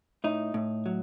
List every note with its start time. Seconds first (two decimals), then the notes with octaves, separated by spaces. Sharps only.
0.24 A2 D#4
0.54 A2
0.86 F#3